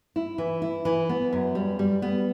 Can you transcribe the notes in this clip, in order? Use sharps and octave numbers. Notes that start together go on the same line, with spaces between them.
E4
E3
E4
E3
B3
F#2
G3
G3
B3